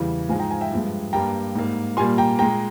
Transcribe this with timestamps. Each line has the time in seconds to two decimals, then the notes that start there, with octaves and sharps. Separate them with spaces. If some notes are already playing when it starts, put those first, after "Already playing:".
Already playing: E2 C#3 E3 G3
0.29 G#2 F3 G#3 F5 G#5
0.39 G5 A#5
0.51 F5 G#5
0.61 E5 G5
0.71 G2 F3 G#3
1.13 G2 G3 A#3 G5 A#5
1.55 G#2 G3 A#3
1.97 A#2 G3 A#3 G#5 C6
2.18 G5 A#5
2.39 A#2 G#3 G5 A#5